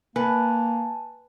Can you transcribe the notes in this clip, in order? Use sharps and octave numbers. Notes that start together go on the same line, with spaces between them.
A#3 B4 G#5 A5